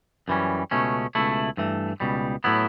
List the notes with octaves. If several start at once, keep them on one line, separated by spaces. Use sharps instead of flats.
F#2 E3 G3 C#4
C#2 B2 A3 C#4
C#2 B2 A3 E4
G2 E3 A3
C#2 B2 G3
A2 F#3 B3 E4